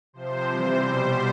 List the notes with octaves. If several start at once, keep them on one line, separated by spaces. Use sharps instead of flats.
C3 F3 C5
C3 E3 G3 C5
B2 G3 C5